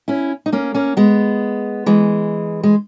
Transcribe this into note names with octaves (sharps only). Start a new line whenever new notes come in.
C#4 E4
D#4
A#3 C#4
A#3 C#4
G#3 B3
E3 G#3
G#3